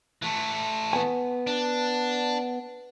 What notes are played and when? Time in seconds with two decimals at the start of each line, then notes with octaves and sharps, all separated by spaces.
0.22 E3 A3
0.93 B3 G#5
1.47 D4